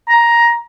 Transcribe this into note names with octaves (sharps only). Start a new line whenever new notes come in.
A#5